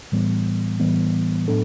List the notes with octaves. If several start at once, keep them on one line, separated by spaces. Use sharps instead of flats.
A2 E3 G3 B3
A2 E3 G3 B3
A2 F#3 B3 D4 A4